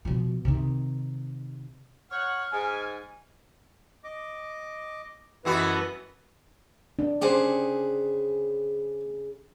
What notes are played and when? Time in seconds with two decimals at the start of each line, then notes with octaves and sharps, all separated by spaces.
0.05 B2 F3
0.45 C3 D#3
2.11 C#5 F#5 F6
2.51 G#2 G#5
4.04 D#5 D6
5.45 F#2 E3 B3 F#4 A4 B4 D#5 A5
6.99 D4
7.21 C#3 G4 G#4 C5 F#5